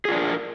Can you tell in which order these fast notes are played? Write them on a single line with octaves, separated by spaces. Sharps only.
G#4 F4 D4 B4 A#4